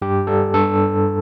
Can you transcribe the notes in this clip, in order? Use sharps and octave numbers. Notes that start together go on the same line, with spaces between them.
G2 G4
G3 A4
G2 A4